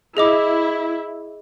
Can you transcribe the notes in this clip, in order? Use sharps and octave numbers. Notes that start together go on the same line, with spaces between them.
E4 G#4 D#5 D6